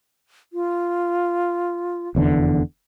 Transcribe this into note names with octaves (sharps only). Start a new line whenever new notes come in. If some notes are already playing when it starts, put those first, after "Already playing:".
F4
F1 E2 D3